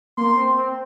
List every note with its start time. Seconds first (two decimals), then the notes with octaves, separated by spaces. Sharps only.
0.17 A#3 C6
0.37 C4
0.57 C4